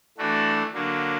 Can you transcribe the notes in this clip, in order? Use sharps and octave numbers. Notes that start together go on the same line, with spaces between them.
E3 A3 D4 F#4
D3 F#3 A#3